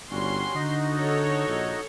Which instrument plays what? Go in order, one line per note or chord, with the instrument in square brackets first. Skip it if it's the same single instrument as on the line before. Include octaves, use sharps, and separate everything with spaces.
[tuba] G1 [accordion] G3 C#4 F#4 [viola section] C6
[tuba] D3 [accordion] D#4 F#4 D#5
[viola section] A4 C#5
[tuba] A#1